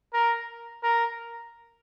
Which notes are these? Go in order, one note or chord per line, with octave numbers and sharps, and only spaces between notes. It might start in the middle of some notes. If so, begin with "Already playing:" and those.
A#4
A#4